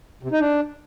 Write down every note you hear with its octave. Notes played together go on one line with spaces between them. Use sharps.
C3
D#4
D4